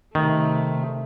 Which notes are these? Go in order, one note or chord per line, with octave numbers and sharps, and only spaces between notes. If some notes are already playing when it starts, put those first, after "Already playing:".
C3 D#3 A3